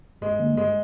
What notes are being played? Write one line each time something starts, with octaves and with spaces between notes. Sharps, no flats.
G2 G#3
D3 G3 A#3
G2 G#3